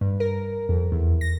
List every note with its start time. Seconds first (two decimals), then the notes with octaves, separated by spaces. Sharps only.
0.01 G2
0.20 A#4
0.69 F2
0.92 E2
1.21 A#6